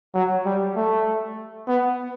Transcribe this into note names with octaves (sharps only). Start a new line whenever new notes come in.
F#3
G3
A3
B3